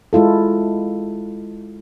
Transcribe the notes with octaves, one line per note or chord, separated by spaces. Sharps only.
G#3 E4 F4 A4